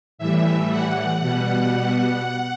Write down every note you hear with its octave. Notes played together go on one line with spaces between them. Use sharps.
A2 E3 G3 E5
F#5
B2 G3 F#5